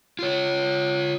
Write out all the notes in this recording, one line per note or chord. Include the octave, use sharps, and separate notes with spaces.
F4 C#5